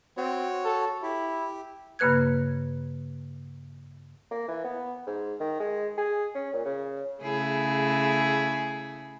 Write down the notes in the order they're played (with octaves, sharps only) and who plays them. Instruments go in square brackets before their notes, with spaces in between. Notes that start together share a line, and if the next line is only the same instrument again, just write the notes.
[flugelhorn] C4 [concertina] F#4 C#5
[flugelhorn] A4
[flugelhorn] E4 [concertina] G4
[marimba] G2 C#3 A#3 B4 F#6 G#6
[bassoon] A#3
E3
B3
G#2
D#3
G#3
G#4
C#4
A#2
C#3
[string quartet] C#3 A3 E4 G#4